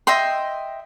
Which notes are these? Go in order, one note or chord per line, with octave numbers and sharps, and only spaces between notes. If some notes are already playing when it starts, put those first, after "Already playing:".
D#5 E5 G5 C6